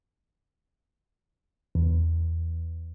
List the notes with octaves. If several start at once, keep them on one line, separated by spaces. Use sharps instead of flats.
E2